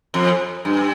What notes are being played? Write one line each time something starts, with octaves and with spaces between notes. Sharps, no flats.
F2
G2